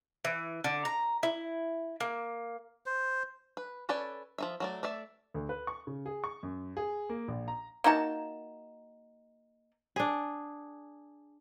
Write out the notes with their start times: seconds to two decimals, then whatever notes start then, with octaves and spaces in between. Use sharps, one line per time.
0.25 E3
0.64 D3
0.85 A#5
1.23 E4
2.00 A#3
2.86 C5
3.57 B4
3.89 C#4 A4 B4 C#5 D5
4.38 F3 D#4 E5
4.60 F#3 A3 D5
4.83 A3 D5 E5
5.34 D2
5.49 B4
5.67 C#6
5.87 C#3
6.06 G#4
6.24 C#6
6.43 F#2
6.77 G#4
7.09 A#3
7.28 A#1
7.48 A#5
7.84 A#3 D#4 F#4 A5
9.96 D4 G#4